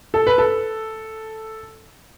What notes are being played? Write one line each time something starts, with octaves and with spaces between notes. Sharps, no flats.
A4
B4
A4